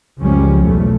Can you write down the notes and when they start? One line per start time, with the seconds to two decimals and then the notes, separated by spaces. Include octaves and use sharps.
0.19 C#2 F#2 F3 G3 C#4
0.62 B1 E2 A3